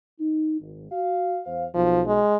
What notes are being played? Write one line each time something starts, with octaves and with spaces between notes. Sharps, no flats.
D#4
G#1
F#4 F5
E2 C5 F5
B1 F3
G#3